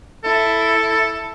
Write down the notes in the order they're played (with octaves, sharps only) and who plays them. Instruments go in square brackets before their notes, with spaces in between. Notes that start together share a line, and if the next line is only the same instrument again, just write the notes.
[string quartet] E4 [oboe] A4